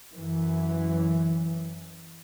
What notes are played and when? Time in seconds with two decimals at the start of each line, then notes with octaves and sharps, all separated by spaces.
0.14 F#2 E3